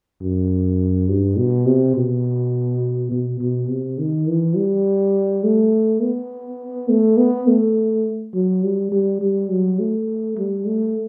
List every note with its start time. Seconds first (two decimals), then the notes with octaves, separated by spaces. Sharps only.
0.21 F#2
1.08 G2
1.37 B2
1.66 C3
1.95 B2
3.11 B2
3.40 B2
3.69 C3
3.98 D#3
4.28 E3
4.56 G3
5.44 A3
6.02 B3
6.89 A3
7.18 B3
7.47 A3
8.34 F#3
8.63 G3
8.92 G3
9.21 G3
9.50 F#3
9.79 A3
10.37 G3
10.67 A3